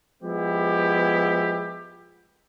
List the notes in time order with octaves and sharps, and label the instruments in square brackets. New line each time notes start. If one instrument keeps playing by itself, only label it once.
[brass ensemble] F3 G#3 B3 E4 G4